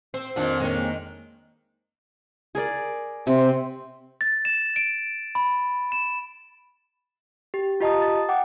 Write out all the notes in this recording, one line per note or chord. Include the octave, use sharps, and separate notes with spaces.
C4 C5
F2 A#2 D#3 D4 F4
D#3 G#3 A#3 C#5
G#4 A#4 D5
C3 C4
A6
E7
D7
B5
E7
G4
F4 G4 D#5 A5 A#5 D#6
A6
F#5 G5 D6